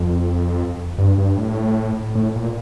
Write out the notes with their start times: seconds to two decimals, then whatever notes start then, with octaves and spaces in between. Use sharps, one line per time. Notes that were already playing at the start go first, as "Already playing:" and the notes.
Already playing: F2
0.98 G2
1.18 G2
1.37 A2
2.15 A2
2.36 A#2